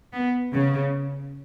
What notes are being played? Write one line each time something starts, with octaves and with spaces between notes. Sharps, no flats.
B3
C#3